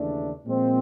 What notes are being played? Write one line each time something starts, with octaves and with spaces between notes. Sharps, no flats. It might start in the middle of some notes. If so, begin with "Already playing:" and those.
Already playing: D#2 C#3 E3 A3 D4
A#2 F3 G#3 C4